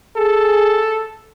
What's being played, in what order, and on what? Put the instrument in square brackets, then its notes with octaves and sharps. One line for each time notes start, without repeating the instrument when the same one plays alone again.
[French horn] G#4 [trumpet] A4